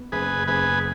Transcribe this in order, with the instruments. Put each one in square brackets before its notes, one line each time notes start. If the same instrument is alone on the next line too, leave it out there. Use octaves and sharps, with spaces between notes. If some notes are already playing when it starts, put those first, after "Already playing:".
Already playing: [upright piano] B3
[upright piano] F#1 [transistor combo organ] G#4 B4
[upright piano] F#1 [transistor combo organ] G#4 B4